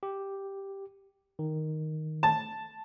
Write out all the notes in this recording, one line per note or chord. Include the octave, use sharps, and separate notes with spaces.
G4
D#3
A5